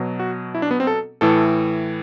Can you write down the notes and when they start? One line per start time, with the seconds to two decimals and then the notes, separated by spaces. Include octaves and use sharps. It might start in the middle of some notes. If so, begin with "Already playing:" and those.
Already playing: B2 F#3
0.19 F#4
0.55 E4
0.62 D4
0.71 B3
0.80 C4
0.87 A4
1.21 A2 E3 A4